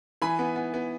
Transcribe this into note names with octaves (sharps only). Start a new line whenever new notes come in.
E3 G#5 B5
B3
B3
B3